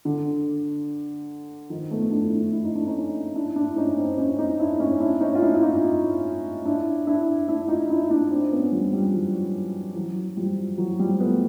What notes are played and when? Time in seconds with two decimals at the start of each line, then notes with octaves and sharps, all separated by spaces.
0.05 D3
1.70 D#3 F3
1.91 A3 B3
2.11 D4 E4
2.32 D4 E4
2.53 E4
2.64 D#4
2.75 D4
2.87 C#4 D#4
3.35 D4 E4
3.56 D4 E4
3.76 C#4 D#4
3.97 C4 D4
4.18 C#4 D#4
4.39 C#4 D#4
4.59 D4 E4
4.80 C#4 D#4
5.00 D4 E4
5.21 C#4 D#4
5.35 F4
5.42 D4 E4
5.55 E4
5.62 D#4 F4
6.65 D4 E4
7.07 D4 E4
7.48 D4 E4
7.68 D#4 F4
7.89 D4 E4
8.10 D4 E4
8.30 C4 D4
8.51 B3 C#4
8.72 F3 G3
8.92 F3 G3
9.14 E3 F#3
9.96 E3 F#3
10.37 F3 G3
10.78 E3 F#3
10.99 F3 G3
11.20 A3 B3